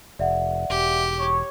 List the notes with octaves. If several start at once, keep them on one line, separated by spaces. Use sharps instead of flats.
F1 D5 E5 F#5
E1 G4
C#5